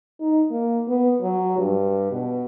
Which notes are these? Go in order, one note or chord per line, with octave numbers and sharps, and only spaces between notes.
D#4
A#3
B3
F#3
G2
B2